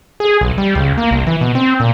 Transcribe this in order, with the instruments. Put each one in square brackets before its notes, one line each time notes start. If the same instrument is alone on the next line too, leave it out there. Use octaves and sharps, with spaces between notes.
[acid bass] G#4
B1
G3
C#2
A#3
C2
E3
B2
C4
A#2